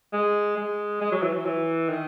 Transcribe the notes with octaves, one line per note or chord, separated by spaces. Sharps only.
G#3
G#3
G#3
F#3
E3
F#3
E3
D#3